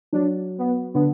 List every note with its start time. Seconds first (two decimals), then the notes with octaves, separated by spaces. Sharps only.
0.13 F#3 D4
0.58 B3
0.94 D3 B3